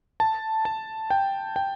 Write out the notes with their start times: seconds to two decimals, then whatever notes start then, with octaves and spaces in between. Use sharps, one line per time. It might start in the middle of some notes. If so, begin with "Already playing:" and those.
0.20 A5
0.65 A5
1.10 G5
1.56 G5